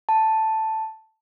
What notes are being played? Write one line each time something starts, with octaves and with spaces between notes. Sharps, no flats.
A5